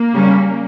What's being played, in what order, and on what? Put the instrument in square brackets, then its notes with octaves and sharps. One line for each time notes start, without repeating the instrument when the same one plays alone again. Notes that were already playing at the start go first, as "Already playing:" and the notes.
Already playing: [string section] A#3
[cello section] C#3 G3 C#4